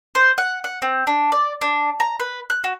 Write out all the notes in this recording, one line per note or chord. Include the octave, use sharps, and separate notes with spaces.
C5
F#5
F#5
C4
D4
D5
D4
A#5
B4
F#6
F#4